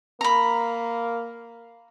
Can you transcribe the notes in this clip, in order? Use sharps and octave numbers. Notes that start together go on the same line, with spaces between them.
A#3 A#5 B5